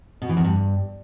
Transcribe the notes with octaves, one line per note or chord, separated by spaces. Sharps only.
B2
E3
E2
G2